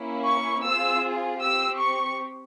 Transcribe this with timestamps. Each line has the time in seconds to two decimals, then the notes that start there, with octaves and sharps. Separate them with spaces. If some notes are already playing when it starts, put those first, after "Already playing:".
Already playing: A#3 C#4 E4
0.25 C#6
0.64 C4 F4 G#4 E6
1.40 C4 G4 E6
1.79 C#6